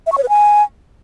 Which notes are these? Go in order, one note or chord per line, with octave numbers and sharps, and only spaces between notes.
E5
C#6
C#5
B4
G#5